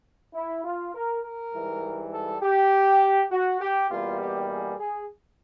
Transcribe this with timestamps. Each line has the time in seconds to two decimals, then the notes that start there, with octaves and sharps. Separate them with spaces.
0.35 E4
0.65 F4
0.95 A#4
1.24 A#4
1.54 G#2 E3 G3
2.13 A4
2.42 G4
3.31 F#4
3.61 G4
3.91 E2 B2 G3 A#3 F4
4.21 G4
4.51 G#4
4.80 G#4